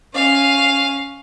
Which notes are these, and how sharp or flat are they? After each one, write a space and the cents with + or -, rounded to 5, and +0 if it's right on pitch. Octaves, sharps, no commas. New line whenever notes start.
C#4 +0 F5 +0